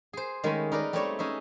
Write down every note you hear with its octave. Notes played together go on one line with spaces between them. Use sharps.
G#4 C5
D#3 G#3 A3 C#4 G#5 B5
D#4 A#4 B4 D5
G3 A3 C4 D#4 C#5 D5
C#4 D#4 G#4 E5